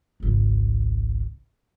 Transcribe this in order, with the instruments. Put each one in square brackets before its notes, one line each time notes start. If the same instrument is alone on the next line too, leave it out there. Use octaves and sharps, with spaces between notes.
[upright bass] G#1 C#2